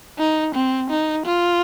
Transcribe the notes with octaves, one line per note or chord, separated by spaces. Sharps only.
D#4
C4
D#4
F4